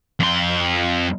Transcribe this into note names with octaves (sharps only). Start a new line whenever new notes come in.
F2 C6